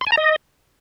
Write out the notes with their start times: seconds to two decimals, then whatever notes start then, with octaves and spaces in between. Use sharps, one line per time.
0.01 C6
0.07 G#5
0.12 A#5
0.17 D#5